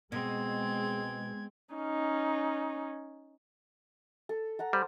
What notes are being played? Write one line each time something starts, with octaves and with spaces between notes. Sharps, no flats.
B2 G#3 C4 G#6
C#4 D#4
A4
A4 F#5 A#5
G3 C5